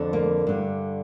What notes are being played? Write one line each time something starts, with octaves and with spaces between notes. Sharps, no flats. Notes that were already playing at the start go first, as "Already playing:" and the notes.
Already playing: F2 D3
A#3
G2 D3